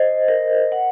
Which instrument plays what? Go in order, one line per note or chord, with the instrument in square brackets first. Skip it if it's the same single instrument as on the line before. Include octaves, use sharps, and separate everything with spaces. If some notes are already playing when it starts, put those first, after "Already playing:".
Already playing: [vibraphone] C5 D#5
A#4
F#5